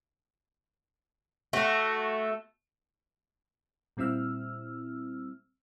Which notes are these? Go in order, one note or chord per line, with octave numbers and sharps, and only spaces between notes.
A3 F#4
A#2 G3 C4 E4 E6 F6